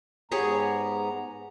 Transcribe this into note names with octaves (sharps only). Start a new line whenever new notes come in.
G#2 B3 G4 G#4 C#5 A#5